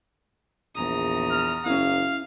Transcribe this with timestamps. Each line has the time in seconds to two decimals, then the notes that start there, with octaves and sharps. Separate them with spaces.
0.76 A#1 E2 A#5 D#6
1.31 F6
1.66 F#1 C#4 E4 F5